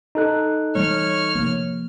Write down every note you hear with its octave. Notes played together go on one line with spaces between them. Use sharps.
D#4 A4 F#6
E3 G3 A3 C#5 F6
C3 F3 A#3